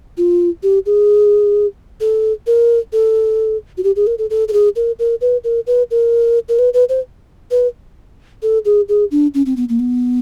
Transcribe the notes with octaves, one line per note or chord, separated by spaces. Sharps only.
F4
G4
G#4
A4
A#4
A4
F#4
G4
G#4
A#4
A4
A4
A4
G#4
A#4
A#4
B4
A#4
B4
A#4
A#4
B4
B4
C5
B4
A4
G#4
G#4
D4
C#4
C4
B3
A#3
B3